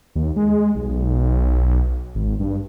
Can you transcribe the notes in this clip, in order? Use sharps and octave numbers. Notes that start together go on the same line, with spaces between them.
D#2
G#3
B1
G#1
G2